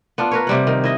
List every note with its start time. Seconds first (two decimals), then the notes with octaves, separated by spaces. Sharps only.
0.18 B3 D4 F4
0.31 A#4 B4 C#5
0.47 C3 G3 F#5
0.67 D#3
0.84 E4 D#5